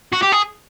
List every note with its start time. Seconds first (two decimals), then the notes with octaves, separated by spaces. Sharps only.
0.13 F#4
0.22 G4
0.32 G#4